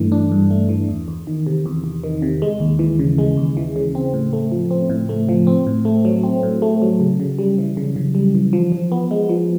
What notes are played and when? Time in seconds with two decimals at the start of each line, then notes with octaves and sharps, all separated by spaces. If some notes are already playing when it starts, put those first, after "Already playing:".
Already playing: G2 E3 A3 D4
0.12 D4
0.32 G2
0.51 A3
0.69 E3
0.88 E2
1.08 E2
1.27 D#3
1.46 C3
1.66 E2
1.84 E2
2.04 D#3
2.22 C3
2.42 G#3
2.60 D#2
2.79 E3
2.99 C#3
3.18 G#3
3.37 D#2
3.57 E3
3.76 C#3
3.95 C4
4.14 A2
4.33 A3
4.52 F3
4.71 C4
4.89 A2
5.09 A3
5.29 F3
5.47 C4
5.66 A2
5.85 A3
6.05 F#3
6.23 C4
6.43 A2
6.62 A3
6.82 F#3
7.00 C#3
7.20 C#3
7.39 G3
7.58 E3
7.77 C#3
7.96 C#3
8.15 G3
8.35 E3
8.53 F3
8.72 F3
8.92 B3
9.11 G#3
9.29 F3